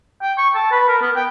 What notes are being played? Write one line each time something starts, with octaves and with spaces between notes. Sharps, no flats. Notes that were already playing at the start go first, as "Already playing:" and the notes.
G5
C#6
A5
B4
A#4
B3
G5